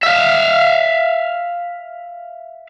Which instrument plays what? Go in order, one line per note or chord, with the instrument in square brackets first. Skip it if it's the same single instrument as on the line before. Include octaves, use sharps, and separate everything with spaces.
[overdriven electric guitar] E5 F5